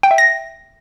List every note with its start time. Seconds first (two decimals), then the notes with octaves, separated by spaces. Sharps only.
0.03 G5
0.11 E5
0.18 A#6